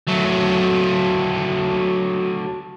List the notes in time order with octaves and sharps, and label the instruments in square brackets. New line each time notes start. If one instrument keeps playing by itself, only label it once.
[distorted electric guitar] F#3 A3